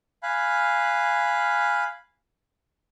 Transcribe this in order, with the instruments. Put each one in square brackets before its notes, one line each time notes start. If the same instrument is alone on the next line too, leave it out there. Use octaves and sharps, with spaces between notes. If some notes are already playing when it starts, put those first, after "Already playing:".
[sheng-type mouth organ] F5 G#5 B5 F#6